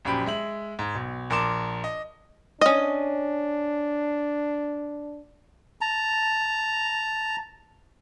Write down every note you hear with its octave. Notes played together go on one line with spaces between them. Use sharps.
A#1 F#2 G4 C5 B5 D7
G#3 E5 F#7
G#2
B1
A#1 A#4 A5 C6 D6 E7
D#5
C#4 D4 D#5
A5 A#5